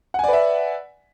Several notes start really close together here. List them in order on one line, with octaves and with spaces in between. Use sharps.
F#5 G#5 D5 B4 E5